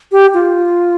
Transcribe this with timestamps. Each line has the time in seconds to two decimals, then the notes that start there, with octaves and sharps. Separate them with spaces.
0.12 G4
0.34 F4